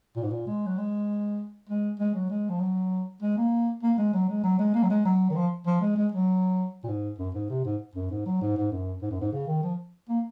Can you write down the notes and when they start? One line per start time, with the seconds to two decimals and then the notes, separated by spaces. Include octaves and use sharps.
0.16 A#2
0.23 G#2
0.30 A#2
0.47 G#3
0.66 F#3
0.78 G#3
1.69 G#3
2.00 G#3
2.15 F#3
2.30 G#3
2.50 F3
2.60 F#3
3.22 G#3
3.37 A#3
3.83 A#3
3.98 G#3
4.14 F#3
4.29 G#3
4.44 F#3
4.59 G#3
4.74 A#3
4.83 F#3
4.90 G#3
5.05 F#3
5.31 D#3
5.36 F3
5.66 F3
5.82 G#3
5.96 G#3
6.12 F#3
6.84 A#2
6.88 G#2
7.19 F#2
7.34 G#2
7.50 C3
7.65 G#2
7.95 F#2
8.11 G#2
8.26 F#3
8.41 G#2
8.57 G#2
8.72 F#2
9.02 G#2
9.11 F#2
9.21 G#2
9.32 C#3
9.48 D#3
9.63 F3
10.10 A#3